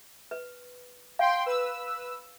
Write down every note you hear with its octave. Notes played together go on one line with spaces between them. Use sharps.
B4
F5 G5 C6
B4 E6